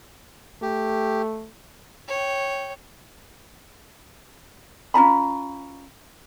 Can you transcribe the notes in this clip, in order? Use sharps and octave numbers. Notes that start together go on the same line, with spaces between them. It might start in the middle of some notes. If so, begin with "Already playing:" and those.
A3 G4
C#5 G5
C#4 F4 A#5 B5